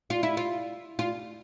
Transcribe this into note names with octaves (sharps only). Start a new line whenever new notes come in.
F4
E4
F4
F4